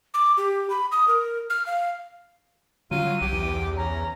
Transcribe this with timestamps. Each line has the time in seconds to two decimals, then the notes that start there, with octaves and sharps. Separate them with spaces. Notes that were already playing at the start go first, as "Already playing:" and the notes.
0.14 D6
0.37 G4
0.70 B5
0.92 D#6
1.08 A#4
1.50 F6
1.66 F5
2.91 D3 F#3 G3 C#4 F4 D#7
3.21 C2 G4
3.33 E2
3.77 C#4 A#5